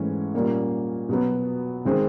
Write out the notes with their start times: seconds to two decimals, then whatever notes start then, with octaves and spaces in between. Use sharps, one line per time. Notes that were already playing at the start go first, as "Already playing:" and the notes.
Already playing: G#2 E3 A3 C#4
0.34 A#2 G3 A#3 C#4
1.09 B2 F#3 B3
1.85 D#3 G#3 C4